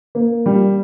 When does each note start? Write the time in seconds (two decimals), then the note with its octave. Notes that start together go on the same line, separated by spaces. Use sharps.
0.15 A#3
0.46 G3